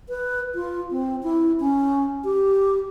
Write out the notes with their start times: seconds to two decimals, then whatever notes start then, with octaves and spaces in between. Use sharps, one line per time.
0.09 B4
0.55 F4
0.91 C4
1.23 E4
1.60 C#4
2.24 G4